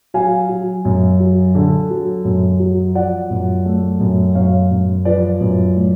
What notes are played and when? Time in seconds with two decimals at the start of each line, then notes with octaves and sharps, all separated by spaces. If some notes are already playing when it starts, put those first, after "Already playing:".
0.14 F#3 F5 G#5
0.49 F#3
0.85 F#2
1.20 F#3
1.55 D3
1.90 F#3
2.25 F#2
2.60 F#3
2.95 F3 D5 F#5
3.30 F#2
3.65 A3
4.00 F#2
4.35 F#2 C#5 F5
4.71 F#2
5.05 F3 B4 D5
5.41 F#2
5.76 A2